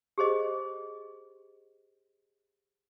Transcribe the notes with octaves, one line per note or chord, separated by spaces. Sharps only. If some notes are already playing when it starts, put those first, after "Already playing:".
G4 G#4 C5 D#5